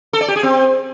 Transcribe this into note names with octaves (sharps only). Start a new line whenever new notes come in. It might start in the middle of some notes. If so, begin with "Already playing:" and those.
A4
D5
G4
G#4
C4